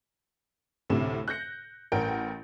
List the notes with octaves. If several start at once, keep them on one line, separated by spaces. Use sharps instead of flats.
D2 A2 C3 E7
F#6 G6 A#6 C#7
A1 A#4 F#5 G5 G6 D7